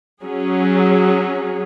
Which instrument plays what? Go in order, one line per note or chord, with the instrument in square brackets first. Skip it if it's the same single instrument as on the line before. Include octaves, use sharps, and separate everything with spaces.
[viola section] F#3 C#4 G#4